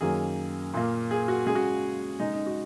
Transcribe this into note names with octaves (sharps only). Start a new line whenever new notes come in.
F#2 D#3 F#3 A#3 G#4
A#2 A#3
G#4
F#4
C#3 G#3 G#4
F#4
C#3 G#3 D#4
D#4
F#4